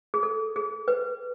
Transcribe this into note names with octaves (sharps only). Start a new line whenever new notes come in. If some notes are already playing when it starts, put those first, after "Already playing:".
G#4
A4
G#4
B4